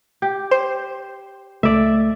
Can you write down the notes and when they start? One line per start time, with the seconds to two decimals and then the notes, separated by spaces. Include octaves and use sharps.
0.22 G4
0.51 C5
1.63 C#2 A3 D5 E5